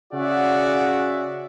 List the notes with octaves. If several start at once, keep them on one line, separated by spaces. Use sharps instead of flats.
C#3 F#4 G#4 D5 E5 F#5